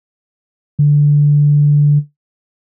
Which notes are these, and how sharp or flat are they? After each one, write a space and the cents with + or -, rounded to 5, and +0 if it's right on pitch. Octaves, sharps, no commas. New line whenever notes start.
D3 -5